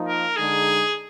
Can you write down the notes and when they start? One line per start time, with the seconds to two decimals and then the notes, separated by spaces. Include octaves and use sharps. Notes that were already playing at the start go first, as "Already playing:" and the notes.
Already playing: F3 A#3 D#4
0.08 A#4
0.36 D3 G#3 D#4 G#4